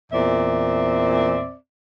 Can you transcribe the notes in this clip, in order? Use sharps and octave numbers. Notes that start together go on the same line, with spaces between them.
E2 A#2 C4 D5 E5